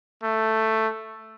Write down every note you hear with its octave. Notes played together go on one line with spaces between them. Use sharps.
A3